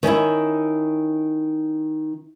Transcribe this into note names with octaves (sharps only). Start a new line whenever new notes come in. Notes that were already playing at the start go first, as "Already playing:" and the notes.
D#3 C#4 D#4 E4